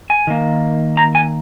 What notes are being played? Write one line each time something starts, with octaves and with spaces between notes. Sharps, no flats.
G#5
D#3 A#3
A#5
G#5